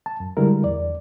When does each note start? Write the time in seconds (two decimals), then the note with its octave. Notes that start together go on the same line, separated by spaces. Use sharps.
0.06 A5
0.20 F#2
0.37 D3 G3 G#3 E4 A#4
0.64 E2 D5